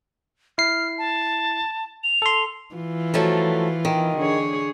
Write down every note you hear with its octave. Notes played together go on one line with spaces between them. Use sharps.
E4 F6 C7
A5
F7
A4 C6
E3 F4
F3 F#3 A3
D#3
D3 G#4 C#5